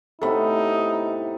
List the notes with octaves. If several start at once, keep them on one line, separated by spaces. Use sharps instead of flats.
A2 C3 B3 D#4 A4 B5